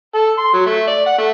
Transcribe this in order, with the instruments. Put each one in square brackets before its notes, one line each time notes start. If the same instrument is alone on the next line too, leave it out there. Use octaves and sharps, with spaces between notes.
[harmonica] A4
C6
F#3
A3
D5
F#5
A3